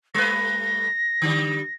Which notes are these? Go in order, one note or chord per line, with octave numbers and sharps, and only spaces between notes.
G3 A3 B4 A#6
D3 G3